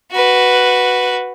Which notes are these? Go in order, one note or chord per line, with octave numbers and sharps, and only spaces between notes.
F#4 B4